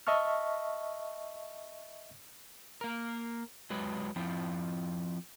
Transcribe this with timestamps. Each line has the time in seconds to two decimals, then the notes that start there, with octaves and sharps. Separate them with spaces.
0.07 D#5 E5 A5 C#6 F6
2.81 A#3 A#4
3.70 F#3 G#3 B4
4.16 F3 C4 E4